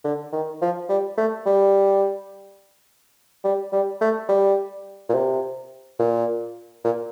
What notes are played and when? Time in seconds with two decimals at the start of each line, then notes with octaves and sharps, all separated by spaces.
0.04 D3
0.33 D#3
0.62 F3
0.89 G3
1.18 A3
1.46 G3
3.44 G3
3.72 G3
4.01 A3
4.29 G3
5.09 A#2
5.14 C3
6.00 A#2
6.84 A#2